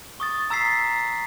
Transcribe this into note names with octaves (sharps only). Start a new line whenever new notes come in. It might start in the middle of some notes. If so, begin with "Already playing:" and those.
C#6 D#6 A6
A#5 E6 A6 B6 C7